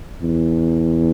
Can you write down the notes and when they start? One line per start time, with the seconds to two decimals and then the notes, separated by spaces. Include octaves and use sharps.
0.22 E2